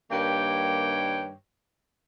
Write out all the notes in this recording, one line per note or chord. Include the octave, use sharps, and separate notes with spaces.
G2 D#3 A#3 G4 C#5 G5